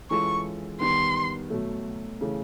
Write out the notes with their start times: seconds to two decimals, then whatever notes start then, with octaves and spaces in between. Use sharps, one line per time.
0.10 E3 G#3 C#4 F4 A4 C#6
0.80 D#3 G3 B3 C6
1.50 B2 F#3 A3
2.21 C#3 E3 A3